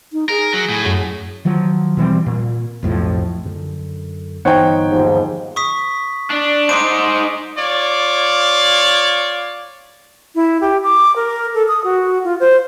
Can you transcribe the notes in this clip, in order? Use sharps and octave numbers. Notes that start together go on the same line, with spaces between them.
D#4
G#4 A#4
F#3
A2
F#2
D#3 F3 F#3
B2 E3 G3 C4
A#2
B1 F2 A2 F3
F#2 D3
G1 E3 B3 D#4 C5 C#5 F#5 G5
D#2 G#2 F3
C#6 D#6 B6
D4
D#4 C5 C6 D6 D7
F4 C#5 D5
E4
G4
D6
A#4
A4
D#6
F#4
F4
C5